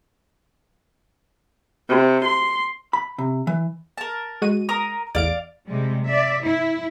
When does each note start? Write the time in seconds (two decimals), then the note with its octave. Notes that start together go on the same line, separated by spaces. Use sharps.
1.89 C3
2.25 C6
2.93 B5
3.18 C3
3.47 E3
3.98 A#4 A5
4.42 G#3 F#4 D#7
4.69 A#4 A#5 D#6
5.15 A1 E2 D5 F5 D7
5.68 C3 G3 G#3
6.07 D5 E5
6.42 E4